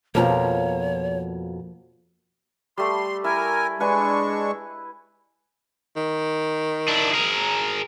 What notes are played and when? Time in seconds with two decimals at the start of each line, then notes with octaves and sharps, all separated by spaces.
0.15 F2 B2 F3 A#3 C#5 A#5
2.78 G3 A3 C6
3.24 E4 A#4 G#5
3.80 G#3 D4 B4 G#5 C#6
5.97 D#3
6.88 D4 E4
7.13 G#4 A#4